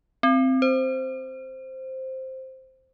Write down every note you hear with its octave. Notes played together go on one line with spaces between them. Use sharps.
C4
C5